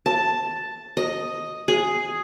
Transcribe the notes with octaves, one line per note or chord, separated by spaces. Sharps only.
A5
D#5
G#4